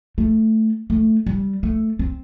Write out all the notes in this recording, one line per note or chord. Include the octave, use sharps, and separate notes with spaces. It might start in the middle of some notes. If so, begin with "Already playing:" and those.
A3
A3
G3
A3
C4